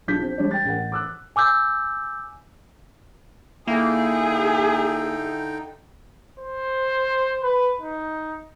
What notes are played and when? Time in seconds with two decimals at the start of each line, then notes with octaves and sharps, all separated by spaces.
0.08 B1 D4 F4 G6 B6
0.21 C4 D4
0.38 G3 G#3 D4 C#5 D5
0.51 G5 A6
0.65 A1 A#4 F#5
0.92 D6 E6 F#6
1.36 G#5 D6 E6 G6
3.67 D3 A#3 D#4 E4 G#4 G5
6.40 C5
7.43 B4
7.81 D#4